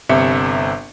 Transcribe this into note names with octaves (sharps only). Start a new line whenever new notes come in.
G1 C3 E5 C#7